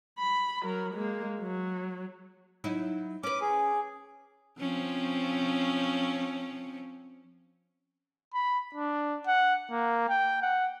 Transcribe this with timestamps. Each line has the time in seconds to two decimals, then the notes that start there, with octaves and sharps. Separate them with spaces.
0.19 B5
0.63 F#3 A#4
0.94 G#3 A#3
1.41 F#3
2.64 F#3 D#4 E4
3.23 C#4 B4 D6
3.41 G#4
4.59 F3 C4 C#4
8.34 B5
8.75 D4
9.27 F#5
9.72 A#3
10.09 G5
10.42 F#5